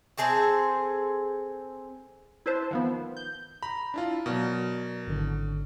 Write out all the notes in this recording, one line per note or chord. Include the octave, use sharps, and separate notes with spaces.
C4 G#4 A4 C5
E4 B4 C5 A5
D#3 F3 B3
G6
A#5 B5
D4 E4 F4
B2 F#3 A#4 D5
G#1 D3